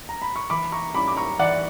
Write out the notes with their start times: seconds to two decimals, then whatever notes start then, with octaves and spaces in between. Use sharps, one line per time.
0.09 A#5
0.22 B5
0.36 C#6
0.50 E3 B5 D6
0.72 A#5 C#6
0.94 G3 C#4 E4 B5 D6
1.08 D6
1.17 A#5 C#6
1.39 E3 D5 F#5